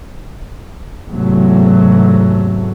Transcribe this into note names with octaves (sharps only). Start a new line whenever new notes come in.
E2 G#2 C3 F#3 A3